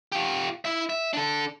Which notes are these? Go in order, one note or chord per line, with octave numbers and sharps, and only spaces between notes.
F4 G4
E4 E5
E5
D4 A4